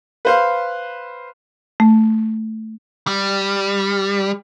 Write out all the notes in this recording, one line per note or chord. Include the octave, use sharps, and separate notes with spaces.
B4 C5 F5
A3
G3